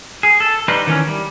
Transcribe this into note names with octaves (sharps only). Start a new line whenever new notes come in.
G#4
A4
G3 D#4 B4 C5
D#3 E3 C#4
G3